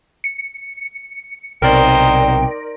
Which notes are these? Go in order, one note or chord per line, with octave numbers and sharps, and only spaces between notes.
C#7
B1 C3 D#4 A#4 C5 D5 G5